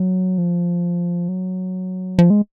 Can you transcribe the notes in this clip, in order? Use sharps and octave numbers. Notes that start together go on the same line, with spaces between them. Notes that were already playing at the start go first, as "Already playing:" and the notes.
Already playing: F#3
F3
F#3
F3
G#3